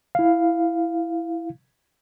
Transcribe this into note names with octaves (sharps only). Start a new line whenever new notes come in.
E4 F5